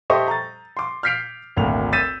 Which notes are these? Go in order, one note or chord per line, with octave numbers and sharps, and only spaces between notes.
G4 A4 C5 D#5 E5 C#6
A#5 A6
C6 D6
F6 G6 B6 C7 D7 F7
G#1 D2 A3 A#3 F7
E6 G6 A6 B6 D#7 E7